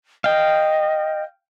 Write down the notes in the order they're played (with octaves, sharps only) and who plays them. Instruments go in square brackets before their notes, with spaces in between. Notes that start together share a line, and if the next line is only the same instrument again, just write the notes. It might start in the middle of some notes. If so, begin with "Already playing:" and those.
[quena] D#5 [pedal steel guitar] F5 G5